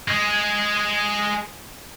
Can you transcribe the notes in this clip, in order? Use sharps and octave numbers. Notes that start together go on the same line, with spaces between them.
G#3 G#4